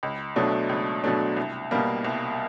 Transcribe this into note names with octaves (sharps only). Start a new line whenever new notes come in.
C#2
B2 F#3 A3 D4
C#2
B2 F#3 A3 D4
C2
B2 G3 A#3
C2